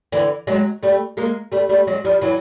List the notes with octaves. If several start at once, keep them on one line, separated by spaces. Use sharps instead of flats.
D3 E3
F#3 G#3
G3 A3
G#3 A#3
G3 A3
G3 A3
F#3 G#3
F3 G3
E3 F#3